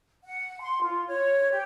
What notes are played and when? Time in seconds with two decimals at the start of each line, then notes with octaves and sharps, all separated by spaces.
0.25 F#5
0.60 C6
0.83 F4
1.07 C#5
1.51 G4